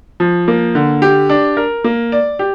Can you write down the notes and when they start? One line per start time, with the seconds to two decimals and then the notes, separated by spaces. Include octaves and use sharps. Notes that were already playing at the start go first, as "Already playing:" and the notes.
0.20 F3
0.48 A#3
0.75 D3
1.02 G4
1.29 D4
1.57 A#4
1.84 A#3
2.12 D5
2.39 G4